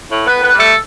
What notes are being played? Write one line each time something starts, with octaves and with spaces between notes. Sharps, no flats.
A2
B3 B4
A2
B3 B4
G3
A3 A4